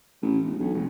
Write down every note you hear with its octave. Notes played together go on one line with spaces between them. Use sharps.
A1
E1
B1
F1